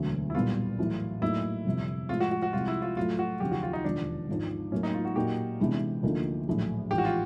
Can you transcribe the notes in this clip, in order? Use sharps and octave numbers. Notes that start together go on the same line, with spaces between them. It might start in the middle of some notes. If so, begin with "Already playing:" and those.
Already playing: E1 D2 D3 F#3
E4
B1 A#2 G3 B3 F4
A1 A2 F#3
A2 F#3 A#3 D#4 E4
G1 F2 C3
A2 F3 G#3 F4
F#4
F#4
F#4
C2 C3 F3 G#3 F4
E4
F4
A2 F#3 A3 F4
F#4
F1 D#2 C#3 F#3 G4
F#4
F4
D#4
E1 D#2 D3 F3 D4
G#1 G#2 F3
A2 F#3 A#3 C#4
D#4
F4
F#4
A#2 F#3 A#3 D#4 F#4 G4
C3 E3 G#3 B3 D4
D2 D3 F3 A#3 D#4
A#1 A2 F#3
A1 G#2 F3 G4
F#4
F4